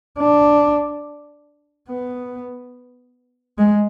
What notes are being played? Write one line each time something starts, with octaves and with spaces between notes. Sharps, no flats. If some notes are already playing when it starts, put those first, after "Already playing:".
D4
B3
G#3